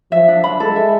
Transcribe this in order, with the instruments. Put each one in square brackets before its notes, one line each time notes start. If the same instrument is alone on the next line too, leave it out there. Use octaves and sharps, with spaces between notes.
[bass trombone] F3 [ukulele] E5
[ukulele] D4
B5
[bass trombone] G#3 [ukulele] A4
[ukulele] E5